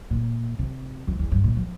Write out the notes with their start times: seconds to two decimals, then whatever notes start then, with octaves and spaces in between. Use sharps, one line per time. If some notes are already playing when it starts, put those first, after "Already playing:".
0.11 A#2
0.59 C3
1.07 F2
1.19 E2
1.32 G2
1.44 A#2
1.56 F3